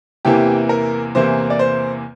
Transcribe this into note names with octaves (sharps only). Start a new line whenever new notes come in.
E2 C3 E3 A#3 G4
A#4
E2 C3 E3 A#3 C5
D5
C5